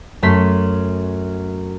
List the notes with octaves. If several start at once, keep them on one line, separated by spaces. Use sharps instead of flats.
F#2 A3 C6 B6